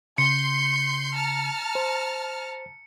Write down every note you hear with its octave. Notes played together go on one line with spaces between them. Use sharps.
C#3 C6 G6 C7 C#7
A5 A#5 F6
C5